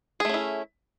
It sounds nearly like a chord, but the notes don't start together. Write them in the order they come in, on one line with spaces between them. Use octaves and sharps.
G#4 A3 C#4 E4